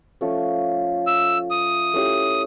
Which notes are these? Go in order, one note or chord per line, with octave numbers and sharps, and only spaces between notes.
F3 A3 C#4
E6
D#6
A3 C#4 E4 G4